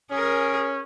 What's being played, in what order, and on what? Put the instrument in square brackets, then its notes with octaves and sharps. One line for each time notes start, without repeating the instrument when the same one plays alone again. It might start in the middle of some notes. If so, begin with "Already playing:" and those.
[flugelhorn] C#4 [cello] G#4 A#4